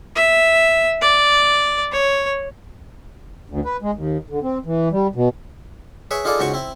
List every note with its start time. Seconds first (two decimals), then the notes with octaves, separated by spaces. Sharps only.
0.16 E5
1.01 D5
1.92 C#5
3.50 D2
3.65 B4
3.82 G#3
3.95 D#2
4.30 D3
4.43 C4
4.66 E3
4.92 G3
5.15 B2
6.11 G#4 B4 C#5 E5
6.25 D#4 F4 G#4 A4 D5
6.39 C#2 G#2 F#4 C5 C#6
6.54 C4 E4